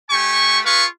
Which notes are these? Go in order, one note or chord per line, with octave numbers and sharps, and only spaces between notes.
A3 G4 G#5 C#6
F4 G#4 B4 F5 C#6